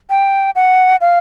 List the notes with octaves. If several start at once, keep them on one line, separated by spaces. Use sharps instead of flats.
G5
F#5
F5